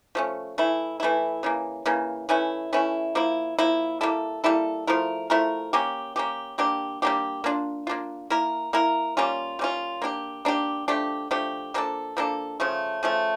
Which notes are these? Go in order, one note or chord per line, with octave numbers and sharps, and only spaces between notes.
F3 A3 C#4
E3 A3 E4
E3 A3 E4
C#3 E3 A#3
C#3 E3 A#3
E3 A3 C#4 E4
E3 A3 C#4 E4
F3 A#3 E4
F3 A#3 E4
G3 A#3 E4 A4
G3 A#3 E4 A4
F3 A3 E4 A#4
F3 A3 E4 A#4
A#3 C#4 G4
A#3 C#4 G4
G3 A#3 D4 G4
G3 A#3 D4 G4
A#3 D4 F4
A#3 D4 F4
A#3 E4 A#4
A#3 E4 A#4
G3 A#3 C#4 F4
G3 A#3 C#4 F4
A#3 D4 G4
A#3 D4 G4
F3 A3 D4 G4
F3 A3 D4 G4
F3 A#3 D4 A4
F3 A#3 D4 A4
C#3 F3 A3
C#3 F3 A3